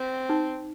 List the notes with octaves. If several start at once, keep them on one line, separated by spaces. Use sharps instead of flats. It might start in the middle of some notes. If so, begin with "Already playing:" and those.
Already playing: C4
D#4